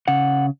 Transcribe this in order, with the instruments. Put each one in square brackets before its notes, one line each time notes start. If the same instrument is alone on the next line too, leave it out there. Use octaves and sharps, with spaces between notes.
[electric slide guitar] C#3 F#5